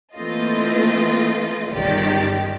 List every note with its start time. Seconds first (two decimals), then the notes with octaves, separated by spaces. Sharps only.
0.15 E3 A3 A#3 C4 F4 D#5
1.70 G1 C#2 D#3 G4 D5